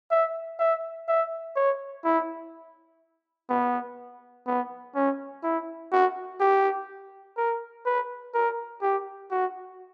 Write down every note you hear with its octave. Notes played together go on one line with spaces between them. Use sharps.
E5
E5
E5
C#5
E4
B3
B3
C#4
E4
F#4
G4
A#4
B4
A#4
G4
F#4